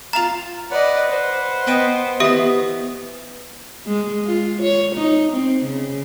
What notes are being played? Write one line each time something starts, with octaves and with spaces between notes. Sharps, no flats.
F4 F5 A5 A#5 F7
B4 D5 D#5 F#5
C5
B3 D#5 G5
E3 B3 G4 E5 D#6
G#3
F4
C#5
D#4
C4
C#3